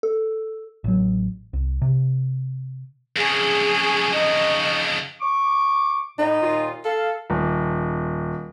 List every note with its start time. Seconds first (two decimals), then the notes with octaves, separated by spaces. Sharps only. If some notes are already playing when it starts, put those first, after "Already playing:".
0.03 A4
0.84 A1 F#3
1.53 C2
1.82 C3
3.16 F2 C#3 G#4
4.13 D#4
5.21 C#6 D6
6.19 A2 D#4
6.42 D#2 A#2 F4
6.85 A4 F5
7.30 D#1